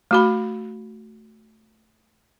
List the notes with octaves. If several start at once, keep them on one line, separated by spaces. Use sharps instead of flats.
A3 F#4 B5